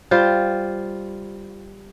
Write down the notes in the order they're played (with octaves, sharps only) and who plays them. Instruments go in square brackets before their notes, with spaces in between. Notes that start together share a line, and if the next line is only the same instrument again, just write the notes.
[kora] G3 F4 C5